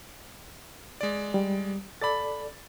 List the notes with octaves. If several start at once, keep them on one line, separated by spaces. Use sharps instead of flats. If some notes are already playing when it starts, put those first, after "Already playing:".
G#3 D5
G3
A4 D5 B5 A6